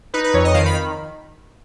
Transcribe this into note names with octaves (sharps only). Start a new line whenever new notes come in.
D#4 B4
B4
F2 C#5
D#5
D#3 F5
B5